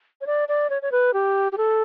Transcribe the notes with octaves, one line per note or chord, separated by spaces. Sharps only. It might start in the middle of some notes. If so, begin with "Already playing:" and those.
C#5
D5
D5
C#5
C#5
B4
G4
G4
A4